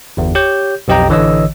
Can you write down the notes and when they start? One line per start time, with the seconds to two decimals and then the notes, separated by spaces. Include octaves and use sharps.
0.17 G1 E2
0.35 G4 C#5 G6
0.88 B1 F2 G4 D#5 G5 A#5
1.09 A1 D3 E3 C#5 D#5 E6